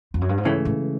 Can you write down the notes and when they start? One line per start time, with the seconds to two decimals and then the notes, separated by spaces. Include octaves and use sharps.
0.14 F2
0.21 F#2
0.29 G2
0.38 G#2
0.45 C#2 A2 C#3 E3 A3
0.65 A2